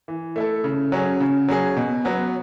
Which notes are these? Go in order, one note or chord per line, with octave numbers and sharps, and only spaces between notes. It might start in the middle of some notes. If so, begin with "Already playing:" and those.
E3
A3 E4 A4
C#3
F#3 C#4 G#4
C#3
F#3 C#4 G#4
B2
F#3 B3